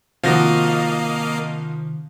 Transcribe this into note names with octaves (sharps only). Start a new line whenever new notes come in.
C3 D#3 F3 A#3 F#4 D#5 F5 A#6